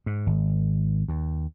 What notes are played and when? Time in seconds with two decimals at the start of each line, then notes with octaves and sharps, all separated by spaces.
0.06 G#2
0.26 G#1
1.08 D#2